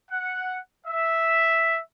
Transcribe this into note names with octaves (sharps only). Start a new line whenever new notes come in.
F#5
E5